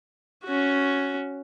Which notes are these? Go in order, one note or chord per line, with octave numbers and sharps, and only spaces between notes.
C#4 F#4